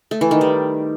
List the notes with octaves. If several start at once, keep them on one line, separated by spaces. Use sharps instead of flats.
A3
E3
D#3
G3